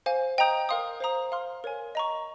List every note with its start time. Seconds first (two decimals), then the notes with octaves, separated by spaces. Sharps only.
0.06 C5 F5 G#5
0.38 D#5 G5 A#5 D#6 G6
0.69 A#4 F5 C6 D#6
1.00 C5 F5 A#5 D#6
1.32 F5 C6 F6
1.64 A#4 C#5 G#5
1.95 D#5 A#5 C#6